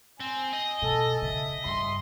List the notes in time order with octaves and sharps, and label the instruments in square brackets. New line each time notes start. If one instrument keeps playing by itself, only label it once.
[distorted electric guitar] C4 [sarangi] G#5
[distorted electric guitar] D#5
[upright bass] B2 [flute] A4
[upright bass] C#3 [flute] E5
[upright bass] G2 [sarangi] C6